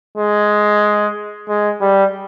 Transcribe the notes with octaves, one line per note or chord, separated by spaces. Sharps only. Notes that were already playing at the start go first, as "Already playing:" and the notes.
G#3
G#3
G3